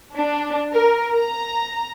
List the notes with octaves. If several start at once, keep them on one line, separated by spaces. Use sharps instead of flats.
D4
A#4
A#5